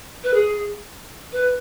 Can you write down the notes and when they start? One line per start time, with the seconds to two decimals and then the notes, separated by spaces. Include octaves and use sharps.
0.23 B4
0.33 G#4
1.32 B4